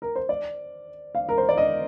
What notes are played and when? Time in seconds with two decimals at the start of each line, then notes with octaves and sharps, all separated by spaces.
0.02 A#4
0.16 C5
0.29 D5
1.15 F5
1.29 A#4
1.38 C5
1.49 D5
1.58 D#5